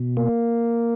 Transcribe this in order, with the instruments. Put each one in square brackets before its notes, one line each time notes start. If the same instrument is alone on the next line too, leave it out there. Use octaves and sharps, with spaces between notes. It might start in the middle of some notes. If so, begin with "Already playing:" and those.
Already playing: [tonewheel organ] B2
A#3